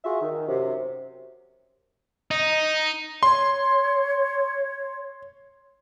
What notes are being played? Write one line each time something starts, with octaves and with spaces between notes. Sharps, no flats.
F4 F#4 G#4 E5
D#3
F#2 C3
D#4
C#5 C6